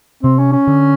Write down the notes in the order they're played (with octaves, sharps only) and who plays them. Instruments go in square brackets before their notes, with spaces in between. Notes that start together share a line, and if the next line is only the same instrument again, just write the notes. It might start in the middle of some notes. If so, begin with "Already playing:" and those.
[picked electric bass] C3 [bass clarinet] C4
[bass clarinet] C#4
C#4
[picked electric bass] D3